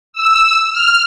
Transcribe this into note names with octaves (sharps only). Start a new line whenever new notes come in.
E6
F6